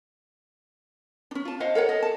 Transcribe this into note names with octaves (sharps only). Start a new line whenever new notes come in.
C#4 D4
F4 A5
C5 D#5 F5 F#5
A4 A#4 C#5 F#5
D#5
A5